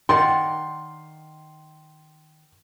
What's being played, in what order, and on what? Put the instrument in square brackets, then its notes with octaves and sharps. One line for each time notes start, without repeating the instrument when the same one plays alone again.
[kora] D#3 D5 F#5 [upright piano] C6